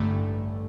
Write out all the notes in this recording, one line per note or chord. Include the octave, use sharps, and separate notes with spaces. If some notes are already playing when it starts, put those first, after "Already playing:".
Already playing: A1 G2 D3 A3